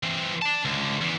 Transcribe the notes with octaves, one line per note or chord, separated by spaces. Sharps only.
E3 C4
D5 A5
C#2 D3
E2 E3